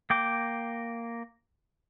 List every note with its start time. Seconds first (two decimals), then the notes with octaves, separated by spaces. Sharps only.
0.10 A#3 G5 D6